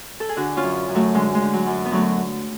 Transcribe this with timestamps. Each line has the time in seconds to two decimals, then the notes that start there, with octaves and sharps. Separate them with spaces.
0.20 A4
0.29 G#4
0.36 D3 D4 F#4
0.57 C#4 F4
0.63 F#2
0.89 F#2
0.95 F#3 A3
1.15 D3 G#3
1.35 G#3
1.41 D3
1.53 F#3
1.67 F#2
1.86 B3
1.91 D3 F#3 A3